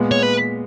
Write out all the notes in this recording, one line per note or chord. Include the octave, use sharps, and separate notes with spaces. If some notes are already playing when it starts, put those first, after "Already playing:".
Already playing: A#2 G#3 B3
C#5
B4